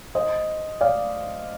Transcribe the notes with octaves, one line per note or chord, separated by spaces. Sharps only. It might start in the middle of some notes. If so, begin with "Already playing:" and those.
C5 D#5
D5 F5